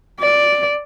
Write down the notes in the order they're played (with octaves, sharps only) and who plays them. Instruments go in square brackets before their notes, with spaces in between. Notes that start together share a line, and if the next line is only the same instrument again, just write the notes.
[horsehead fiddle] D5